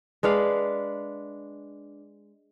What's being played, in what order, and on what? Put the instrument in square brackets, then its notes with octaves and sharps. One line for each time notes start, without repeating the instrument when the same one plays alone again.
[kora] G#3 D4 B4 F5